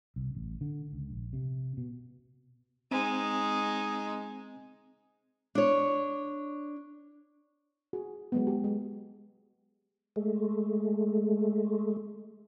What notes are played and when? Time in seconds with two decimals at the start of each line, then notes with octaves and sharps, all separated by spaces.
0.16 C2
0.35 A1
0.61 D3
0.93 C#2
1.10 A#1
1.33 C3
1.77 B2
2.91 G#3 C4 D#4
5.55 D4 C#5
7.93 F#4 G#4
8.32 F#3 G#3 B3
8.47 G4
8.64 G#3
10.16 G#3 A3